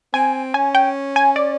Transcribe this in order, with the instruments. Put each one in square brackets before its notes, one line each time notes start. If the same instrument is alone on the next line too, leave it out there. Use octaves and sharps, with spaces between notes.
[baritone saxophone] C4 [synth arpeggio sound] G#5
[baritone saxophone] C#4 [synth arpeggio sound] G#5
[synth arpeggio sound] G5
G#5
D5